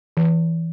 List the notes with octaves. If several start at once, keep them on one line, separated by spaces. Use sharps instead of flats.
E3